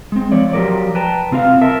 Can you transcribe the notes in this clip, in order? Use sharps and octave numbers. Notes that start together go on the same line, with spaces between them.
G#3 C4
F3 C#5 D5
F3 F#3 G4 G#4 A#4 D5
B4 G5 A5 A#5
C3 C4 F4 A#4 F5
A#4 E5 A5